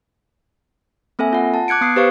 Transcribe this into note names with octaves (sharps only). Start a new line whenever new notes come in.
A#3 C4 A4 E5 G#5
F4 F#5
A5
D6 F#6 G#6 C#7 D7
B3 D#6 C7
G4 B4 C5 F5 C#6